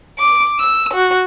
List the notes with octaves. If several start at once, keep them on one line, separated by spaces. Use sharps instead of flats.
D6
E6
F#4